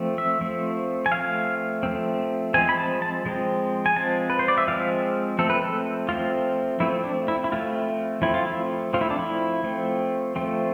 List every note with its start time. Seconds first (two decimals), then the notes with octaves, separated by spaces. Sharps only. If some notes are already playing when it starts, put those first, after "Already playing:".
Already playing: F3 A3 C4
0.18 E5
0.41 F3 A3 C4
1.06 G#5
1.12 F3 A3 C4 F5
1.83 F3 A3 C4
2.54 F3 G#3 C4 G#5
2.69 B5
2.78 A5
3.02 A5
3.26 F3 G#3 C4
3.86 G#5
3.96 F3 G#3 C4 A5
4.30 B4
4.39 C5
4.48 D5
4.58 E5
4.68 F3 G#3 C4 F5
5.39 F3 A3 C4 A4
5.50 B4
5.62 A4
6.09 F3 A3 C4 F4
6.80 F3 A3 C4 E4
7.04 D4
7.28 E4
7.44 E4
7.52 F3 A3 C4 F4
8.22 F3 A3 C4 E4
8.34 F4
8.47 E4
8.93 F3 A3 C4 F4
9.01 E4
9.10 D4
9.19 E4
9.64 F3 A3 C4
10.36 F3 A3 C4